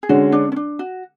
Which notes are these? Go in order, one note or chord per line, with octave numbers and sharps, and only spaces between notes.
G#4
D3 G#3 C#4 F#4
D4
C#4
D4
F#4